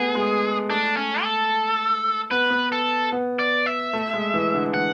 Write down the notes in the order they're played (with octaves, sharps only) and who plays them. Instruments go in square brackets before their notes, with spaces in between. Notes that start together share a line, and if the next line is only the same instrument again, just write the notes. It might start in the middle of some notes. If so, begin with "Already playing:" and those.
Already playing: [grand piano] A3 B3 [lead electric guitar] G#4
[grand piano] G#3
[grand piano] A3 [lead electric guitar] D4
[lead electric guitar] C#4
A4
[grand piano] B3 [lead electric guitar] B4
[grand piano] B3
[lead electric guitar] A4
[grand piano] B3
[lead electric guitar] D5
E5
[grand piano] A3
G#3
E3
D3
[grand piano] E3 [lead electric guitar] F#5